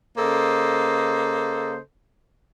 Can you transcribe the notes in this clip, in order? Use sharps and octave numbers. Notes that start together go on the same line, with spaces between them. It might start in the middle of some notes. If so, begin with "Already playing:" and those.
C#3 A#3 A4 C5 D#5